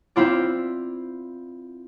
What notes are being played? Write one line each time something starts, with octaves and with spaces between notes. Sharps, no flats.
C4 E4 F4 D5